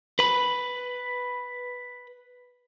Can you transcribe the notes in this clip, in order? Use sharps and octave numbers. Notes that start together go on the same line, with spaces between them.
B4 B5